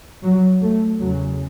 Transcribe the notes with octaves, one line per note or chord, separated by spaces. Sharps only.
F#3
A3
E2 C#3 F#3